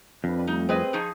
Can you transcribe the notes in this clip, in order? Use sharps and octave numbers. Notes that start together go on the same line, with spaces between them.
F2 C4 D4 B4
G3 A3 D#4
C4 G#4 B4 D#5
F3 D#4 G#4 C#6 G#6